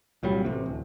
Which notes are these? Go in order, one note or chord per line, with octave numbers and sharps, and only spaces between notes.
C2 A#2 F#3 G3
A1 C3
D1